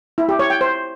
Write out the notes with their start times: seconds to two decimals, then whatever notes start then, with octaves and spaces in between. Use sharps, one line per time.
0.18 E4
0.29 G4
0.39 C#5
0.50 G5
0.61 C5